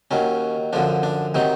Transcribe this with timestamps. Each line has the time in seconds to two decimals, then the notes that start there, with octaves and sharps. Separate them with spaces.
0.11 D#2 D#3 F#3 C#4
0.73 F#2 D3 F3 D4
1.03 D4
1.35 C3 D#3 F#3 D#4